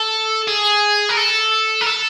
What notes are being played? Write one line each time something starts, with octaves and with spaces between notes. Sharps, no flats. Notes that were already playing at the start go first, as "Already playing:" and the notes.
Already playing: A4
G#4
A#4
A4
A#4
A4